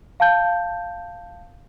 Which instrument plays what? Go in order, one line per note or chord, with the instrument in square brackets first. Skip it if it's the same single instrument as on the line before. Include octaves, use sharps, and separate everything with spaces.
[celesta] F5 A5 G6